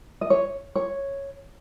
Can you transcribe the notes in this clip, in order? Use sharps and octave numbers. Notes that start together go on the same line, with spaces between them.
D#5
C#5
C#5